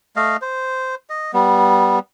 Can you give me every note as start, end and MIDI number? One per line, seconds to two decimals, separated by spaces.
0.16 0.37 57
0.16 0.37 75
0.16 0.37 77
0.42 0.95 72
1.10 1.31 75
1.33 1.99 55
1.33 1.99 59